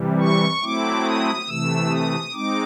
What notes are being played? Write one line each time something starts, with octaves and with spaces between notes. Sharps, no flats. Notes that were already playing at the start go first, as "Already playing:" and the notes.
Already playing: C3 E3 G3
C#6
F#3 A3 C4 E4 D6
D#6
C3 E3 A3 E6
D#6
G#3 C4 D#4 D6